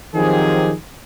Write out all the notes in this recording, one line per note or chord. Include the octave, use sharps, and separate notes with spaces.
D#3 F3 F#3 C4 G4 G#4